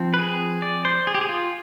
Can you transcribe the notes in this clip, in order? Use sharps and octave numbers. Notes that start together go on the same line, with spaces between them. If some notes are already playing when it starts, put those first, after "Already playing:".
Already playing: F3 C4
B4
G#4
D5
C5
G#4
G4
G#4
F4